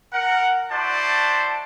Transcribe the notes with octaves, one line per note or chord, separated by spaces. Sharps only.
A#4 F#5
E4 F#4 C5 D5 A5